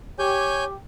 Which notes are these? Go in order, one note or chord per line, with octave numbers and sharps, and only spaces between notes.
G4 C#5 G#5 G6